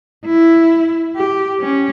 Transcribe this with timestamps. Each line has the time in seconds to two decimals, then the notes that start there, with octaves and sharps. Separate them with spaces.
0.25 E4
1.16 G4
1.61 C#4